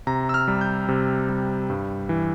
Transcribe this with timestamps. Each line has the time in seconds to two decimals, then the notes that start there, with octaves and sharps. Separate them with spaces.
0.07 C3 A#5
0.29 E6
0.34 F6
0.48 G3
0.61 G6
0.88 C3
1.29 G3
1.70 G2
2.09 E3